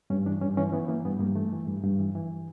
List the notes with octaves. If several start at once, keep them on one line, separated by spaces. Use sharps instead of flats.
G2 C#4
E3 D4
G2 C#4
E3 C#4
E3 B3
E3 A#3
G2 B3
G2 A#3
E3 A3
E3
G2
G2
E3
E3